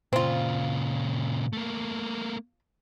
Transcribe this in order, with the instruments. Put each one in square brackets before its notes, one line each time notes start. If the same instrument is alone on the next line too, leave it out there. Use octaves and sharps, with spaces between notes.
[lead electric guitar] A#2 C#3 [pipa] C4 F4
[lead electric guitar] A3 A#3